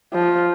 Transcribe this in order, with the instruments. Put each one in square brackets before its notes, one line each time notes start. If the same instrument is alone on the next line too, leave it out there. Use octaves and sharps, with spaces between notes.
[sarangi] F3